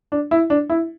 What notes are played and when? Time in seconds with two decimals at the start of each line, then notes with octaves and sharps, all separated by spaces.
0.12 D4
0.31 E4
0.50 D4
0.70 E4